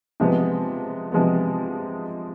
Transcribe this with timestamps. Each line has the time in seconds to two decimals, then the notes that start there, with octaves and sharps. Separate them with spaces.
0.20 C3 F3 G#3 B3
1.12 C3 F3 G#3 B3